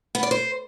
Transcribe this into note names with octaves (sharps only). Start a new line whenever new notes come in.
B3
D5
C5